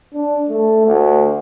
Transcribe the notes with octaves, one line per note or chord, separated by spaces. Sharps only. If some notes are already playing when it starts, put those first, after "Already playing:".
D4
A3
D2